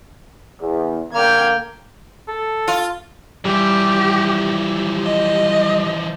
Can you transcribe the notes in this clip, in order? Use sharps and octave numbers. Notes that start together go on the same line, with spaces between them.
E2
D3 A#3 G5 F6 G#6
A4
F4
E3 F3 G3 G4
D#5